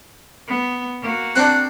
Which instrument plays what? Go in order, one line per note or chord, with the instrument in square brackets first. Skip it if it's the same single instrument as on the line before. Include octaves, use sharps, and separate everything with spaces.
[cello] B3
A#3 F#4
[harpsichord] C4 D4 [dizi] F#6